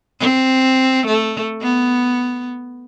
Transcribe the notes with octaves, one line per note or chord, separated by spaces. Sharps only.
C4
A3
B3